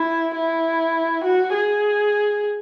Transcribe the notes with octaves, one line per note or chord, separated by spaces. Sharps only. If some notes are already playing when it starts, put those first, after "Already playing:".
Already playing: E4
E4
F#4
G#4